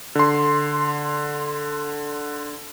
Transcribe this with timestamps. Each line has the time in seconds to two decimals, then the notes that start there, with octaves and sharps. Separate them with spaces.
0.15 D3 C6